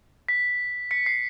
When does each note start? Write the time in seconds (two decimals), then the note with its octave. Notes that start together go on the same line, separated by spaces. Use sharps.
0.29 B6
0.91 B6 C#7
1.06 C7